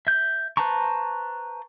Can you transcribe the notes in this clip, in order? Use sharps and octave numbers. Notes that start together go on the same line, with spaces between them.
E5 G6
B4 C5 A5 A#5 C#6